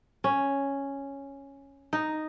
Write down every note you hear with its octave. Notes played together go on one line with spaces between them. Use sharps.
C#4
D#4